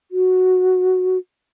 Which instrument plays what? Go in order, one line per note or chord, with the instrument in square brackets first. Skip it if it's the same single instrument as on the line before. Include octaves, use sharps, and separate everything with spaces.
[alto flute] F#4